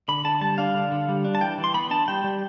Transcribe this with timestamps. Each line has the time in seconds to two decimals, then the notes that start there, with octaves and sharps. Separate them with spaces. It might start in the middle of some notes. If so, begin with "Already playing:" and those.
0.08 D3 B5
0.25 D3 A5
0.41 G3 A5
0.58 D4 F5
0.74 D3
0.92 D3
1.09 G3
1.25 D4
1.35 A5
1.41 E3 G5
1.58 E3
1.64 C6
1.74 B3 B5
1.91 D4 A5
2.08 G3 G5
2.24 G3